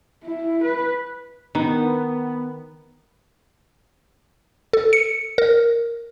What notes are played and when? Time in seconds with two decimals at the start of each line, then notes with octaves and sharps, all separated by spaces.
0.24 E4
0.64 B4
1.55 D#3 B3
4.73 A4
4.93 C#7
5.38 A#4